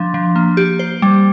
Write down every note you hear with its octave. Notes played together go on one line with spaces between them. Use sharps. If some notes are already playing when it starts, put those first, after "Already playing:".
Already playing: F3 D4
F3
A#3
G4
C5
G3